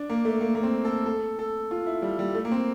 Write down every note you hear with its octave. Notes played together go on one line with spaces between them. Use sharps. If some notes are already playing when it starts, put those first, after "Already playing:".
Already playing: D4
A#3
A3
A#3
A#3
C4
A4
A4
A4
F4
E4
G3
G3
A3
A#3
C4